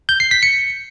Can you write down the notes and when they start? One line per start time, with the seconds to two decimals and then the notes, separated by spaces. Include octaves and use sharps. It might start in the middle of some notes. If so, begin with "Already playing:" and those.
0.09 G6
0.20 C7
0.31 B6
0.43 C#7